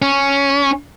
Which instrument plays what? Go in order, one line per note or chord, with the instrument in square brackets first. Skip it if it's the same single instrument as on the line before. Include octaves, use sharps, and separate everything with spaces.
[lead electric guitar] C#4